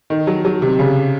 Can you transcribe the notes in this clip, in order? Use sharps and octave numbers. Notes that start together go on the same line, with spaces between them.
D#3
F#3
F#3
C3
C#3